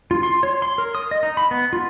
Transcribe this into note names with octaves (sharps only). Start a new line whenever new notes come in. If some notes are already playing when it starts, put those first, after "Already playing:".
F4
C6
C#5
C6
A#4
D#6
D#5
D#4
B5
B3
F4